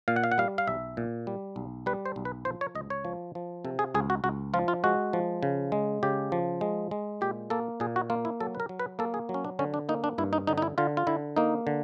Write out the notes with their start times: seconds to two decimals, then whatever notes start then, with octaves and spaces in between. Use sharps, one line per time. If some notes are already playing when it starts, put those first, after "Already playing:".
0.08 A#2 F5
0.16 F#5
0.24 F5
0.32 F#5
0.38 G3 F5
0.58 F5
0.67 B1 E5
0.97 A#2
1.27 G3
1.56 B1
1.86 G3 B4
2.06 C5
2.16 B1
2.25 B4
2.45 F3 C5
2.61 C#5
2.75 C#2 D#5
2.90 C#5
3.05 F3
3.35 F3
3.65 C3 A4
3.79 G#4
3.94 C#2 G#4
4.10 F#4
4.24 C#2 F#4
4.54 F3 F4
4.68 F4
4.84 G#3 F#4
5.13 F3
5.43 C#3
5.72 G#3
6.03 C#3 G4
6.32 F3
6.61 G#3
6.91 G#3
7.21 A#2 G4
7.50 A#3 A4
7.80 A#2 G#4
7.96 F#4
8.10 A#3 F4
8.25 E4
8.40 F#3 A4
8.55 B4
8.60 A#4
8.69 F#3
8.79 B4
8.99 A#3 A4
9.14 G#4
9.29 F#3
9.34 C#4
9.45 D4
9.59 D3 C#4
9.74 D4
9.89 A#3 D#4
10.04 D4
10.18 G2 E4
10.33 D#4
10.47 D3 D#4
10.58 D#4
10.62 E4
10.78 D3 F4
10.97 F4
11.07 D3 E4
11.37 A#3 D#4
11.67 D3